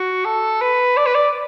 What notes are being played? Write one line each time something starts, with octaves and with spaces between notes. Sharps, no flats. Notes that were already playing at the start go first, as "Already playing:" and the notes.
Already playing: F#4
A4
B4
D5
B4
D5